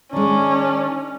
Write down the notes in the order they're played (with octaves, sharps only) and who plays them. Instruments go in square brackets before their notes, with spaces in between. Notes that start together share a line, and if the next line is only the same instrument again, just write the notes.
[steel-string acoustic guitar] D#3 G#3 [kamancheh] C#4 [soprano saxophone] D4